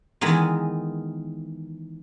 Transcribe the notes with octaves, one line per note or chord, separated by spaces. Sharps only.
D#3 E3 G#3 B3 D#4